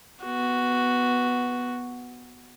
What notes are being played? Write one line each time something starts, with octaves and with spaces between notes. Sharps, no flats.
B3 F#4